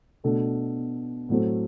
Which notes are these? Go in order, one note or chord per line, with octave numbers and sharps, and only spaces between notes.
B2 A3 D4 A4
A2 F#3 C4 F#4 A4